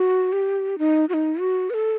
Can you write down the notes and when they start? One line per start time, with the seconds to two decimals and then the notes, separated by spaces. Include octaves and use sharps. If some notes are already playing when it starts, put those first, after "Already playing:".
Already playing: F#4
0.33 G4
0.79 D#4
1.09 F#4
1.14 D#4
1.40 F#4
1.70 B4
1.74 A4